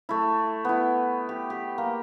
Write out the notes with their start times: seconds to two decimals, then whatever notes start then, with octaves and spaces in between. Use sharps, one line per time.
0.09 A3 E4
0.65 B3 E4
1.29 G4
1.50 G4
1.78 A#3